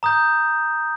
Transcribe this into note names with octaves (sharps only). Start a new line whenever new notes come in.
A#5 D#6 G6